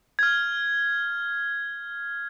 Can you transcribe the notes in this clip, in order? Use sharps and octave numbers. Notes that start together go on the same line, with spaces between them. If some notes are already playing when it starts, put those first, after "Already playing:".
F6 G#6